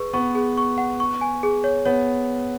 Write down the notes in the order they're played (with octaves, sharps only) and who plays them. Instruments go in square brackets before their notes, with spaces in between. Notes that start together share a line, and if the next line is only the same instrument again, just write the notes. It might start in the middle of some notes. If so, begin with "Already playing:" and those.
Already playing: [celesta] G#4 B4 C#6
[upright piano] B3 [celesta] C#6
[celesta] G#4
C#6
F#5
C#6
G#5
G#4
C#5
[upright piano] B3 [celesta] C#5